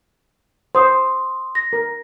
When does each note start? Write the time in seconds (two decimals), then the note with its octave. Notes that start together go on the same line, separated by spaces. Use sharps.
0.75 C5 C6 D#6
1.55 A#6
1.73 A#4